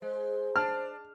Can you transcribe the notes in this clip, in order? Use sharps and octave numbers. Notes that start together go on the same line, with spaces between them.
G#3 C5
D4 A5 F6